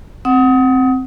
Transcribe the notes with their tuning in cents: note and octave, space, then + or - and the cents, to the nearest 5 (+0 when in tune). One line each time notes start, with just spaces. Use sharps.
C4 +0 F#5 +5 D#6 +25